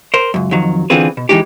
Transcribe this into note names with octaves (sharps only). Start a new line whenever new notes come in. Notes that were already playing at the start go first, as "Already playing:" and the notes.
A#4 C5
C#2 F#2
F2 D#3 F#3
D3 E3 C4 F4 G#4 B4
B2
E3 F#3 G#3 D#4 G4